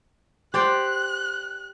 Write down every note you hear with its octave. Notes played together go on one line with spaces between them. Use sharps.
G4 C5 D5 F#6